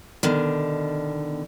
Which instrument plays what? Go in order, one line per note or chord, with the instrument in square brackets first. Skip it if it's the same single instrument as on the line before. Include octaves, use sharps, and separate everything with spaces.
[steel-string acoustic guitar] B2 D3 D#3